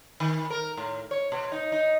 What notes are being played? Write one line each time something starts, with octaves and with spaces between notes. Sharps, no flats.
D#3
A#4
A2
C#5
B2
D#4
D#4